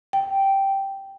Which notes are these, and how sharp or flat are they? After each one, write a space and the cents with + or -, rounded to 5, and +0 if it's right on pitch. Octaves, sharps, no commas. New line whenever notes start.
G5 -5